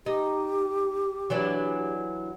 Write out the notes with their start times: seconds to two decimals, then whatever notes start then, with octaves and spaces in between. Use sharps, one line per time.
0.06 D#4 G4
1.30 E3 F#3 D4